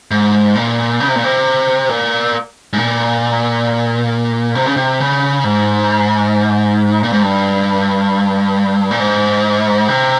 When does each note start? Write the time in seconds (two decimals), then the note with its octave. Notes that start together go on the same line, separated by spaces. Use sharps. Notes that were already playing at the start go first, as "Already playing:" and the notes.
0.11 G#2
0.55 A#2
1.00 C#3
1.08 C3
1.15 A#2
1.24 C3
1.89 A#2
2.73 G#2
2.78 A#2
4.55 C3
4.66 C#3
4.76 C3
5.00 C#3
5.44 G#2
7.03 A#2
7.13 G#2
7.22 G2
8.91 A#2
9.00 G#2
9.88 C3